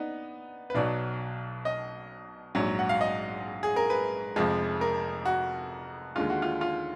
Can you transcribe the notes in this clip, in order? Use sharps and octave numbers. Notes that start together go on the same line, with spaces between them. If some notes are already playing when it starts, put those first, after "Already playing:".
Already playing: B3 D4 D#4
B4
B1 B2 F#3 D5
D#5
A#1 G#2 F#3
F#5
F5
D#5
G#4
A#4
B4
F1 F2 F3 G#3
A#4
F#4
D#2 D3 G#3 F4
F#4
F4
F4